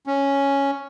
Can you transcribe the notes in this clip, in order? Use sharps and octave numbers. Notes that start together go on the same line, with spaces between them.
C#4